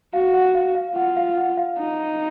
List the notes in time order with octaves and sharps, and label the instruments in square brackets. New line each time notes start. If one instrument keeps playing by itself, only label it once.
[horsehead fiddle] F#4 [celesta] F5
[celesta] F#5
F5
F5
[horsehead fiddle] F4 [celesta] F#5
[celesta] F5
F#5
F5
[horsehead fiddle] D#4